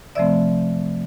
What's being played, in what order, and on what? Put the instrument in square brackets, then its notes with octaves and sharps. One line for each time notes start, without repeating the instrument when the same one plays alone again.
[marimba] C3 F3 A3 C4 D5 E5